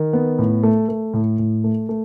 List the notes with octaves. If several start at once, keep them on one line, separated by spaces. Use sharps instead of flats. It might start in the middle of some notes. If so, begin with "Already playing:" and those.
Already playing: D#3
B3
A2
A3
A3
A2
A2
A3
A3